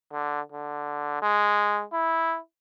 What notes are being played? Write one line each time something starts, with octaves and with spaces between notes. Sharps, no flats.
D3
D3
G#3
E4